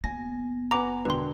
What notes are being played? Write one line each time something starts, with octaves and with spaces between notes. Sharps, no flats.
F#1 B3 G#5 A#6
B4 F#5 G#5 A#5 D6
E1 D3 B4 G5 C6